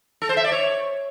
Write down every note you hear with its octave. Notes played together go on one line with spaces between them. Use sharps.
A4
C5
E5
D5
C#5